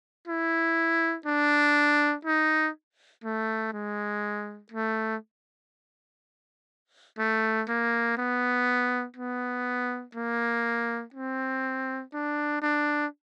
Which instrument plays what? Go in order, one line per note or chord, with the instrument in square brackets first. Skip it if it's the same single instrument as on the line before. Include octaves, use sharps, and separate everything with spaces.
[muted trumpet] E4
D4
D#4
A3
G#3
A3
A3
A#3
B3
B3
A#3
C4
D4
D4